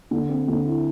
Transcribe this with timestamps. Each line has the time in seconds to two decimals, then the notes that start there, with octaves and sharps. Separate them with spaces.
0.11 D3
0.29 C4
0.48 D3
0.65 E4